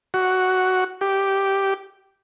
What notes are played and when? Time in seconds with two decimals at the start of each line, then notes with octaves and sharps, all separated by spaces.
0.14 F#4
1.01 G4